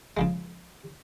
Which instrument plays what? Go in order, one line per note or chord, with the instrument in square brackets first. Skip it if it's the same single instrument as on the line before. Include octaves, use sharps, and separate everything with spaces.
[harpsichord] C#3 F3 G#3